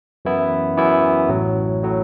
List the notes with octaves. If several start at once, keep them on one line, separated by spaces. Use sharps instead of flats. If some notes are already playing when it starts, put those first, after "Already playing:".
F#2 E3 B3 E4
F#2 E3 B3 E4
A1 A2 F#3
A2 F#3